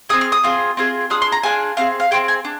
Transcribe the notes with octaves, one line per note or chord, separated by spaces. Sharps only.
C4 D#4 G#4 D#6
F6
D#6
C4 F4 G#4
C4 F4 G#4
D4 F4 G#4 D#6
C6
A#5
D4 F4 G#4 G#5
C4 F4 G#4 F5
F5
C4 F4 G#4 G5
G#5
D4